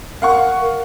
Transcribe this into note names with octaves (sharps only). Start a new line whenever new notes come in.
A#4 F5 F#5 C#6